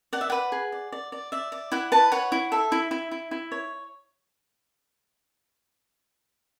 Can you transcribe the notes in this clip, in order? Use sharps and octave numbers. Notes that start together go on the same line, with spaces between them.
D5 F#5
E5
B4 F#5
G#4
D5
D5
D5
D5 E5
D5
E4 F#5
B4 A5
C#5 F#5
E4
A4 E5
E4
E4
E4
E4
C#5